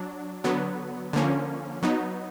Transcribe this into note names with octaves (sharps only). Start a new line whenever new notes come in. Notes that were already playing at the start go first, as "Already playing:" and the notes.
Already playing: F#3 D4
D3 F#3 B3
D3 F3 A#3 C#4
F#3 B3 D#4